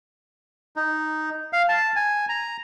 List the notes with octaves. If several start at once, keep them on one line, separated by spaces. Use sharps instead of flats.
D#4
F5
A5
G#5
A#5